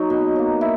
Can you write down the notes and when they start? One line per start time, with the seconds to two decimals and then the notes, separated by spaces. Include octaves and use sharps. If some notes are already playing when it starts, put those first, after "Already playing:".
Already playing: F#3 D#4
0.10 B2
0.36 F#3 A#3
0.61 E4